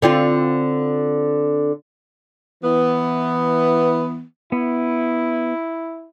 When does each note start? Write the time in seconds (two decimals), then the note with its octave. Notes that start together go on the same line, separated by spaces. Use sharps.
0.02 D3 C4 F4
2.63 E3 B3
4.52 B3 E4